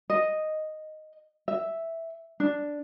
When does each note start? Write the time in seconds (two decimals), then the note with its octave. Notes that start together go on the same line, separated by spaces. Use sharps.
0.10 D#5
1.48 E5
2.40 D4